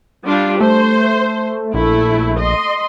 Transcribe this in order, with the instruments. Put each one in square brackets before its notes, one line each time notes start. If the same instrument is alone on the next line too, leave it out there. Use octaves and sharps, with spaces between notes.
[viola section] G3 D4 F4
[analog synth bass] A3 [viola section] C5
[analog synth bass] A#1 [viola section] A3 E4
[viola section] D#5 C6